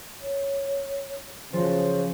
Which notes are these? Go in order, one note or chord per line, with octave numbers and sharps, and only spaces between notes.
C#5
C#3 F3 F#4 C5